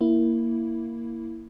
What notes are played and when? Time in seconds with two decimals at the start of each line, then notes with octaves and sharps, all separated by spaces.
0.01 A#3 E4